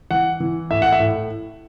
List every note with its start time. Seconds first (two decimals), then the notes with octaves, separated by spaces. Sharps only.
0.11 E3 F#5
0.40 E3
0.70 A2 E5
0.82 F#5
0.92 E5
1.00 A2